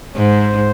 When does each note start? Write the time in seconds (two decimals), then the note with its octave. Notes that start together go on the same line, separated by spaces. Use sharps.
0.16 G#2 C5